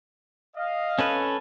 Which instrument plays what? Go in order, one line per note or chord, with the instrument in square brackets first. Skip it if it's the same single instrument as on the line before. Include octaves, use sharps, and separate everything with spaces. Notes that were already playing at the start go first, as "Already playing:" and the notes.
[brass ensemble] D#5 F5
[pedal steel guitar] C#4 A4 B4